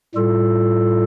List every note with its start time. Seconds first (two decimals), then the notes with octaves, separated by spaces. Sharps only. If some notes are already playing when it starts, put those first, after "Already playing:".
0.15 A2 G3 F4 A4